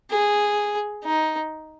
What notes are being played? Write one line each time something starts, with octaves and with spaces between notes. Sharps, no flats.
G#4
D#4